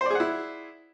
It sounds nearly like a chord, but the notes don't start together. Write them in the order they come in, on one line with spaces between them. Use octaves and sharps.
C5 D5 G#4 F#5 E4